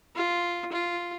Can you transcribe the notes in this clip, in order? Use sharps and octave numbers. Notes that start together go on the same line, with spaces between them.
F4
F4